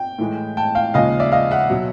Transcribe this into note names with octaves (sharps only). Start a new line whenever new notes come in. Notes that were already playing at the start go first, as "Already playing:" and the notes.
Already playing: G5
A2 E3 G#3
G5 A5
F5 G5
D#2 C#3 F3 G#3 D#5 F5
D5 E5
D#5 F5
E5 F#5
B2 F#3